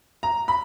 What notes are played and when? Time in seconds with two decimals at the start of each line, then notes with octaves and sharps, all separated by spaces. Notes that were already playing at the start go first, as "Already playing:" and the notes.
0.23 A#5
0.48 B5